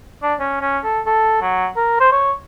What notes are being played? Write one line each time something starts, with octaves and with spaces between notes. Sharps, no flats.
D4
C#4
C#4
A4
A4
F#3
A#4
C5
C#5